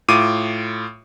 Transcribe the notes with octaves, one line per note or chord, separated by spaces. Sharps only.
A2 F4 D6 D#7